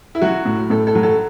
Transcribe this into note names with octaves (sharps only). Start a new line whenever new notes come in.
E4
F#3 F#4
A2
A2 A4
A4
F#3
A4